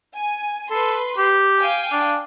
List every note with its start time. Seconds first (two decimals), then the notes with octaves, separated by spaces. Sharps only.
0.15 G#5
0.70 A4 B4 C6
1.17 G4
1.59 F5 G5 G#5
1.92 D4